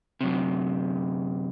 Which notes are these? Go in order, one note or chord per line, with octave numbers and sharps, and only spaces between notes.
F#2 C3